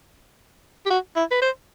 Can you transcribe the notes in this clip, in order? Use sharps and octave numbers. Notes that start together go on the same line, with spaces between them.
G4
F#4
E4
B4
C5